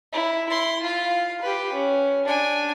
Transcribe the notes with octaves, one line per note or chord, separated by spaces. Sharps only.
E4
E4 C6
F4 F5
G4 B4
C#4
D4 G#5